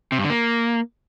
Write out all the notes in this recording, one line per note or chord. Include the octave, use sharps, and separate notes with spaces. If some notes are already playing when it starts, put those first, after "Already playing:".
C3
G2
D3
A#3